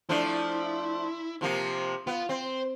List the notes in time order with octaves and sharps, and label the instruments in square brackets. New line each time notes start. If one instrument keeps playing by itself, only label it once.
[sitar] F3 A3 D4 [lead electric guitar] E4
[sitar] C3 F3 A#3
[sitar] B3 [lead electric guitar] F4
[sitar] C4 [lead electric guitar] C5